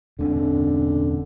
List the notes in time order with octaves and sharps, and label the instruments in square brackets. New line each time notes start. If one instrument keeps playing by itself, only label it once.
[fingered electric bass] E1 C4 C#4 [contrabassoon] D3